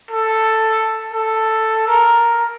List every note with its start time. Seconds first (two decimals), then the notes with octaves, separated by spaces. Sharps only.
0.11 A4
1.14 A4
1.88 A#4